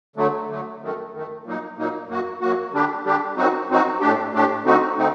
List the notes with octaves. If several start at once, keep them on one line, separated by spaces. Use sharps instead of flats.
D3 F#3 A3
D3 F#3 A3
F#2 D#3 A3
F#2 D#3 A3
A#2 F#3 A#3 D#4
A#2 F#3 A#3 D#4
F#2 F#3 A#3 F#4
F#2 F#3 A#3 F#4
D3 G3 D4 G4
D3 G3 D4 G4
F#2 F#3 C4 D#4 F#4
F#2 F#3 C4 D#4 F#4
A2 A3 D4 G4
A2 A3 D4 G4
D3 A3 C4 D#4 F#4
D3 A3 C4 D#4